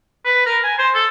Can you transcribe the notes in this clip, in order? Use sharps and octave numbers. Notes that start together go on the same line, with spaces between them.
B4
A#4
G#5
C5
A4